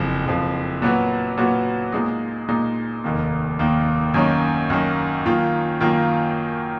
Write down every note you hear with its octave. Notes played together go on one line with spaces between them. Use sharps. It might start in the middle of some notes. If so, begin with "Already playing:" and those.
Already playing: F#1 F2 F3
F#1 F2 F3
A#2 F#3 B3 F#4
A#2 F#3 B3 F#4
A#2 G#3 D#4
A#2 G#3 D#4
F1 D#2 D#3 A#3
F1 D#2 D#3 A#3
F#2 D#3 A#3 C#4
F#2 D#3 A#3 C#4
F#2 D#3 A#3 F4
F#2 D#3 A#3 F4